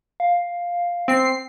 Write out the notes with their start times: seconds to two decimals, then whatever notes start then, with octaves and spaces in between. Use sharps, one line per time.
0.20 F5
1.08 C4 C7